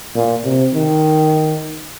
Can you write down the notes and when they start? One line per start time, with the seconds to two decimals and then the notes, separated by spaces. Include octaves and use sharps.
0.15 A#2
0.45 C3
0.74 D#3